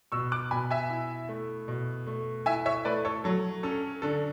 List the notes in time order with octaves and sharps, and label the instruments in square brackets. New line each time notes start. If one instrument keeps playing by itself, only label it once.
[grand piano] B2 [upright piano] C#6 E6
[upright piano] D6 F#6
[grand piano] B2 [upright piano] G#5 B5
[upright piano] E5 G#5
[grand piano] E4
A3
B2
A3
[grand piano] E4 [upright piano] E5 G#5
[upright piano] C#5 E5
[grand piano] A3 [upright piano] B4 D5
[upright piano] A4 C#5
[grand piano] F#3 [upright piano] A4
[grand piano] C#4 [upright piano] A4
[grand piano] D3 [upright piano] A4